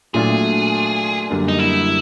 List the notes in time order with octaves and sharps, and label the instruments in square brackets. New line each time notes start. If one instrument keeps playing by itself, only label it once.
[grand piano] A#2 F#3 A3 D4 F4 [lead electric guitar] G#4
[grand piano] F#2 D3 G3 A#3 D4
[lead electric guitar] D#4
E4